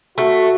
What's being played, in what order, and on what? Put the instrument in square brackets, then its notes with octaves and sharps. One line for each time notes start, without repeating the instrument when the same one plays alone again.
[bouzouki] A3 [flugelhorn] F#4